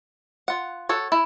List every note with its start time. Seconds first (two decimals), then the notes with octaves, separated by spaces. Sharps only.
0.48 F4 F#5
0.89 F#4 A4 C#5
1.12 E4